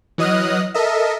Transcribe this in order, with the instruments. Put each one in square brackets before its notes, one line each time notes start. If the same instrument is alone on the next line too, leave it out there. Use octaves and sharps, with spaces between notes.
[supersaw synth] E3 F#3 D#5 D#6 F6 F#6
A4 A#4 D#5 E5